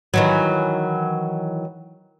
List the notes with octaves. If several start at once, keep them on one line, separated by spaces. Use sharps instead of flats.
D#3 E3 F#3